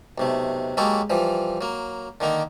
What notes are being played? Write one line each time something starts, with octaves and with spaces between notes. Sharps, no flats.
B1 C3 A3
F#3 G#3 A#3 G4 A4 C#5
E3 F3 G3
F#3 A#3
D3 D#3 A#3 D#4